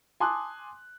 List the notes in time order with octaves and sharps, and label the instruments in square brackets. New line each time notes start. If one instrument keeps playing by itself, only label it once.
[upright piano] G#5 A5 C6 D6 D#6 F#6